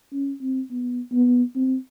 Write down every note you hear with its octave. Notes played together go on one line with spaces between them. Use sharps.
C#4
C4
B3
B3
C4